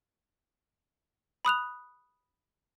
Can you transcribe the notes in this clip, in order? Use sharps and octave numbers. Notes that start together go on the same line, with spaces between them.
B5 D#6 F#6 F7